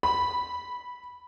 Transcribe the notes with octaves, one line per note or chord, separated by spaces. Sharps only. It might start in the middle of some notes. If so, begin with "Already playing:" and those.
B5